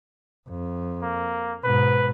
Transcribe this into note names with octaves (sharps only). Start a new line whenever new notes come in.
F2
A#3
G#2 B2 B4